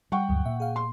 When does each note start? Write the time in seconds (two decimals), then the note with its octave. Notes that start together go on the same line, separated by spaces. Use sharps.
0.12 G3 F#5 G5 C#6
0.29 D2 G2 F#3
0.46 A#2 E5
0.60 G#4 F5
0.76 C6